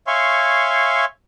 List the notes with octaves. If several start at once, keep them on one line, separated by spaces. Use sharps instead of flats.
C#5 E5 F5 G#5 C6 C#6